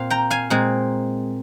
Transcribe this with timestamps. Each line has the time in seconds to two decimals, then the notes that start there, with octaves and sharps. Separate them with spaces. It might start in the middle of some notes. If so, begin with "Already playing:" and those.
Already playing: A#2 C4 F5
0.10 G5 A#5
0.30 F5 G#5
0.50 A#2 G#3 C4